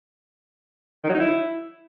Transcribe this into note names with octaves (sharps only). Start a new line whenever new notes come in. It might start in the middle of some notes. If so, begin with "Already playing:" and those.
D#3
F#3
D#4
E4